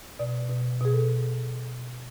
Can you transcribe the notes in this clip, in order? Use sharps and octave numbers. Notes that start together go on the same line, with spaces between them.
B2 D5
B2
B2 G#4
A4